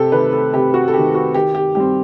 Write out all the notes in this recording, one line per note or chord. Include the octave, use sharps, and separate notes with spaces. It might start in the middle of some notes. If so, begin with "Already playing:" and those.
Already playing: C3 G4 A4
D#3 A3 B4
A4
C3 G4
F#4
A4
D#3 A3 G4
F#4
D#3 G4
G4
G3 C4 G4